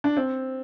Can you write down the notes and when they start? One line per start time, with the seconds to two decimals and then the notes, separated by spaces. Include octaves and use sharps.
0.04 D4
0.17 C4